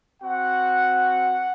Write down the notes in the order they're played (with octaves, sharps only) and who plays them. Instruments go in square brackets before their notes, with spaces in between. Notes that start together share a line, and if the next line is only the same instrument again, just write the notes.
[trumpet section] C4 F#4 F#5